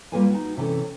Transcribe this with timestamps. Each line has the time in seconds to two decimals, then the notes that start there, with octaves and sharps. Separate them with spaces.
0.12 G3 A#3 F4 G#4 B4 G#5
0.30 D#4 F#4
0.57 C3 E3 C#4 A4